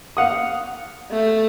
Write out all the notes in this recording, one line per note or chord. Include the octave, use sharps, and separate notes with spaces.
F5 F#5 D#6
A3